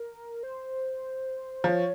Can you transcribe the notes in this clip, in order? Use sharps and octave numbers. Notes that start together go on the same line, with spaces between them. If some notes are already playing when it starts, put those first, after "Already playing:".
Already playing: A#4
C5
F3 C#5